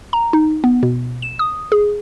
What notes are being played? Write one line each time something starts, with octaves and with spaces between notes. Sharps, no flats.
A#5
D#4
B3
B2
E7
D#6
G#4